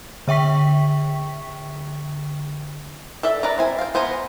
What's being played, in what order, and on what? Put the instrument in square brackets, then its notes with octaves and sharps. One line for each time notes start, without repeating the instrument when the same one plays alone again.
[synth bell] D3 E5 G5 C#6 B6
[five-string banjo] A4 D5 E5
A#4 B4 D5 D#5 A#5
C4 E4 G#5
F5 G5
E3 B3 C5 G#5 A#5